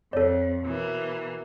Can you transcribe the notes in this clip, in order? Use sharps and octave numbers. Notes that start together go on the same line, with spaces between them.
F2 A4 C#5 D5
B2 E3 A#3